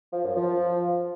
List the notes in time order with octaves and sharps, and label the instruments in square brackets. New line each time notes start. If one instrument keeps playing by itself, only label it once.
[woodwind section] F3
F#2
F3